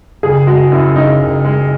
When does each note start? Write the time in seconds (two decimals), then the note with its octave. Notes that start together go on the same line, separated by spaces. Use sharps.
0.23 F#1 G#4
0.47 G#3 F#4
0.72 F#2 E4
0.96 C#3 D#4
1.20 F#1
1.45 G#3